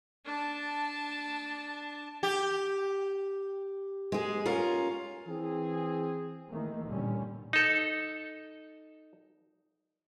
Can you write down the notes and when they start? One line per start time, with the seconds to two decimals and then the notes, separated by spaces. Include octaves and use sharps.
0.25 D4 A5
2.23 G4
4.12 G#3 G#4
4.46 C#4 F4 A#4
5.27 E3 C4 G#4
6.48 D#3 E3 A3 A#3
6.85 A1 D#2 A#2 D3 G3 C#4
7.53 D#4 A4